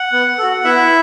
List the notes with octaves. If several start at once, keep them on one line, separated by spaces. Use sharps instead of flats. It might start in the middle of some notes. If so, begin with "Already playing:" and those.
Already playing: F#5
B3
F#4 A4
B3 E4 E5